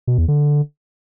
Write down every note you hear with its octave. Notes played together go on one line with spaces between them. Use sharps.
B2
E2
D3